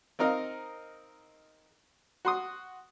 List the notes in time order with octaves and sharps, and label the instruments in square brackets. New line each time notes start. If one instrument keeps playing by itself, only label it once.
[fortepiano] C4 D#4 A#4 D#5 F5
F#4 C6 D#6